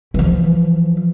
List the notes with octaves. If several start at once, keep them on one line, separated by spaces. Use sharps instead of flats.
E3 F3